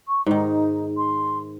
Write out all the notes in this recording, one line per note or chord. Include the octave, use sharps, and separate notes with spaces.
C#6
G#2 D#3 D#4
C6